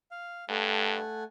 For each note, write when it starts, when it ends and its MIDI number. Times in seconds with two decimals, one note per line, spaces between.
0.11 0.45 77
0.49 1.00 43
0.49 1.24 57
0.49 1.24 78
0.49 1.24 80